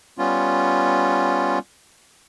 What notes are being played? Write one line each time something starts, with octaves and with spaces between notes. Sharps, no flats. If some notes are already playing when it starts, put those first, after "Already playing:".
G3 B3 C#4 F4